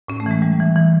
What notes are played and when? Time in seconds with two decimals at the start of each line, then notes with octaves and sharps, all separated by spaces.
0.08 A2 C#4
0.20 A3
0.26 E3 G#3
0.42 E3 G3
0.60 E3
0.76 E3